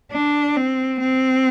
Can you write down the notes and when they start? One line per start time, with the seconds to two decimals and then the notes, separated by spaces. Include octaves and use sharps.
0.12 D4
0.57 C4
1.00 C4